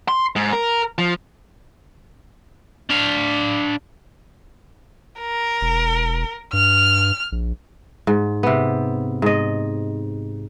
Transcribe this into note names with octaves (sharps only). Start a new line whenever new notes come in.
C6
G#2
A#4
F3
D4 F5
A#4
E1
G2 F6
A#1
G#2
C3 B3
G#2 D#5